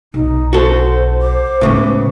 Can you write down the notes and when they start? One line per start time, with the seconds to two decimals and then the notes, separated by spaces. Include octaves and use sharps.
0.14 B1 D#4
0.53 F#4 A4 C5
1.22 C5 D6
1.61 A2 C#3 G#3 B3 B4